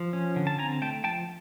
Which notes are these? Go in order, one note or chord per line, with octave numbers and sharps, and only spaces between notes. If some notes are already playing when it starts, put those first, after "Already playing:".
Already playing: F3
C#4
D3
A5
C4 G#5 A#5
A3 G5 A5
F3 G5 A5